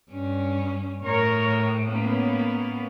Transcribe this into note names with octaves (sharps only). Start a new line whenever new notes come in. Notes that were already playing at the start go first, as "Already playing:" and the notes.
G2 C#4
A2 A#4 C#5
A#3 B3 C#4